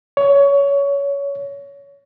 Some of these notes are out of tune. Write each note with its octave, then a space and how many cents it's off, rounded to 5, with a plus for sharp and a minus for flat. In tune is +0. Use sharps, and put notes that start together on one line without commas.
C#5 +20